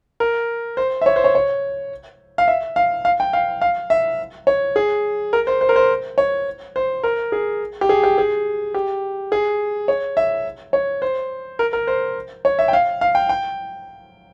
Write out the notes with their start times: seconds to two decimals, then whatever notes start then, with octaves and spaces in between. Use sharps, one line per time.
0.20 A#4
0.77 C5
1.01 E5
1.06 C#5
1.16 C5
1.24 C#5
1.35 C#5
2.38 F5
2.48 E5
2.76 F5
3.05 F5
3.20 G5
3.33 F5
3.62 F5
3.90 E5
4.47 C#5
4.76 G#4
5.33 A#4
5.47 C5
5.61 C5
5.69 A#4
5.76 C5
6.18 C#5
6.76 C5
7.03 A#4
7.32 G#4
7.81 G4
7.89 G#4
8.04 G4
8.18 G#4
8.74 G4
9.32 G#4
9.88 C#5
10.17 E5
10.73 C#5
11.02 C5
11.59 A#4
11.73 A#4
11.87 C5
12.45 C#5
12.59 E5
12.68 G5
12.73 F5
13.01 F5
13.15 G5
13.29 G5